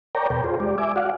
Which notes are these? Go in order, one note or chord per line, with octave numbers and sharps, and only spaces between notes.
A#4 C#5 D5 G5 A#5
E2 B2 A4 B4 G5
F4 G#4 C5
G#3 G4 D5
E5 G#5 D6
F#4 D5 F5 F#5